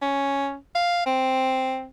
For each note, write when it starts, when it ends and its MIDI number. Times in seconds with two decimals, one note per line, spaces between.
0.02 0.56 61
0.75 1.05 77
1.06 1.86 60